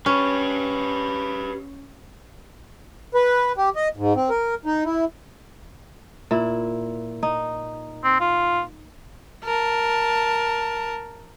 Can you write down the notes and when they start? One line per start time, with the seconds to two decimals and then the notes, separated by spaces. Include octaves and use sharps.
0.06 C#4 G4 B4
3.15 B4
3.57 G4
3.76 D#5
3.97 G#2
4.16 C4
4.30 A#4
4.65 D#4
4.85 E4
6.31 A#2 E4
7.23 D#4
8.04 C4
8.20 F4
9.45 A#4 A5